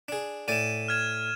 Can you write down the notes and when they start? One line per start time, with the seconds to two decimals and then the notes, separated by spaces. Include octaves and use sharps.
0.08 D4 G#4
0.48 A2 D5 G#5 D#7 E7
0.88 F6 G#6 E7